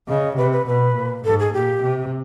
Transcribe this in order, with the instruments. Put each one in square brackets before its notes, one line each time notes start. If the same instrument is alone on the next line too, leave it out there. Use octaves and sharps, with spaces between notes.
[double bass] C#3 [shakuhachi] D#5
[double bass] C3 [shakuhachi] B4
[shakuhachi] B4
[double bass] B2 [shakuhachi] B4
[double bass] A#2
[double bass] G#2 [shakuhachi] A4
[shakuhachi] G#4
[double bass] A#2 [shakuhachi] G4
[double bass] C3